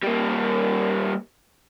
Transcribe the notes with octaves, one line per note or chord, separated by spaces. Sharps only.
G3 A#3